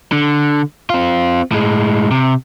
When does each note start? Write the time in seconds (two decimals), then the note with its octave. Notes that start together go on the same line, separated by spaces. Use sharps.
0.12 D3
0.90 C4 F4
1.52 A2 G#3
2.11 C3